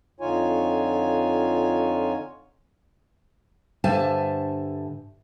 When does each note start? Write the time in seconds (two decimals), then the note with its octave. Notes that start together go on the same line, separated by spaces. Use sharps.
0.20 F2 D3 D#4 F4 C#5 G#5
3.84 G2 D3 C5 E5 G#5 A5